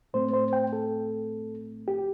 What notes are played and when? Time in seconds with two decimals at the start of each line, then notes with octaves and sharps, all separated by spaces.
0.14 A2 A3 C4 C5
0.34 C5
0.53 G5
0.73 A4
1.88 G4